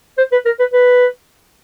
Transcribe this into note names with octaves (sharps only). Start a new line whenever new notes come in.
C5
B4
A#4
B4
B4